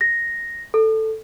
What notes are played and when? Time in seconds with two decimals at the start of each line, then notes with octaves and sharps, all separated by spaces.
0.01 A#6
0.74 A4